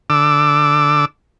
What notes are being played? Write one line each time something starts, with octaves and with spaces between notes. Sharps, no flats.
D3 D6 E6